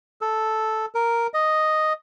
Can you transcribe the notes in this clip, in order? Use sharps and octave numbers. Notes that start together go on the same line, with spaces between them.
A4
A#4
D#5